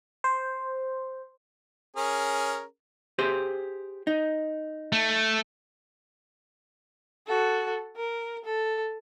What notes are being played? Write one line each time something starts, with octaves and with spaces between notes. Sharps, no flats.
C5
C#4 G#4 A#4
G4 G#4 C5
D#4
A3
F#4 A4
A#4
A4